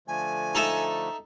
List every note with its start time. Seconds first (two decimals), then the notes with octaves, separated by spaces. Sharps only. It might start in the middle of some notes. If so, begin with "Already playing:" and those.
0.08 D3 F3 A3 G#5
0.55 D#4 A4 E5